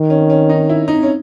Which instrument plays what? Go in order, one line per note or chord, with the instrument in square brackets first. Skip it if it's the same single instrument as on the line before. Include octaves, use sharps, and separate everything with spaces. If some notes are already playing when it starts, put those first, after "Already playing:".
Already playing: [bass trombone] D#3
[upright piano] C#4
C#4
D#4
E4
D#4
C#4